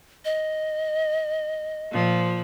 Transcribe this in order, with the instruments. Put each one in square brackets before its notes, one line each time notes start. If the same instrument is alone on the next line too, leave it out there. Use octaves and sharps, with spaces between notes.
[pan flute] D#5
[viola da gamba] A#2 F3